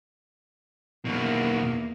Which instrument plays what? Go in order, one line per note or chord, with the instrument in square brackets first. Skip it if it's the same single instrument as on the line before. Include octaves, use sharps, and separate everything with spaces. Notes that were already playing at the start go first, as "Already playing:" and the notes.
[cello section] E2 A#3 [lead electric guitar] B2 D#3